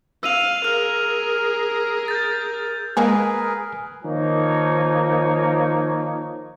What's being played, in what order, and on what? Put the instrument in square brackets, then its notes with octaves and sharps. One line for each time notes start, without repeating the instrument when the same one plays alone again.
[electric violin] F5 [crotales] E6 D#7 F7
[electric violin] G#4 A#4 [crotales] F6 F7
[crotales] G6 A6
[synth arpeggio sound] G#3 A#3 [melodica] G#4 A#4 B4 [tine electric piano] G#5
[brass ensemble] D#3 F3 A#3 D#4 C#5